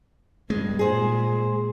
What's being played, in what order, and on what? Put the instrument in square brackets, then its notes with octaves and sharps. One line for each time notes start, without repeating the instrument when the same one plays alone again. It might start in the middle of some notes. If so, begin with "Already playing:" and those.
[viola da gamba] G2 [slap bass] G#3
[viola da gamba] A#2 [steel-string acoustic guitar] G#4 C5